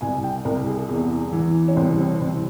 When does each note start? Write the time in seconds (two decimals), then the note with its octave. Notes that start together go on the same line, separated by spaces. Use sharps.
0.01 C2 G#5
0.24 G5
0.45 C2 A#4
0.67 G#4
0.89 E2
1.33 E3
1.68 C#4
1.76 C2 C4
1.89 C#4
1.98 C4
2.21 C2 C4